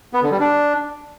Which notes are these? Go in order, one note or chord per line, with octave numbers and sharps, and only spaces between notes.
B3
D3
G3
D4